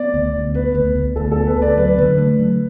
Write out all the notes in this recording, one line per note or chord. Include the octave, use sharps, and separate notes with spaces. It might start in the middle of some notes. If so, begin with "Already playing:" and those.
Already playing: B3 D5
D2
D2
B3 B4
D2
D2
D2 A4
B3 A4
B4
D2
D5
F#3 B4
D3
A3
F#3